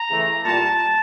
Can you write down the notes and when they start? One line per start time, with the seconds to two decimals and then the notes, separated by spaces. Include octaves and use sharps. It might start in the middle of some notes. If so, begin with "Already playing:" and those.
Already playing: A#5
0.09 C#3 E3 A3
0.44 A#2 G3 A5